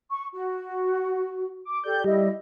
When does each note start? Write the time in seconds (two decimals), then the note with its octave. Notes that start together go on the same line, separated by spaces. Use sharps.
0.10 C#6
0.31 F#4
1.65 D6
1.84 G4 A4 D5 G6
2.04 G3 E4 D#5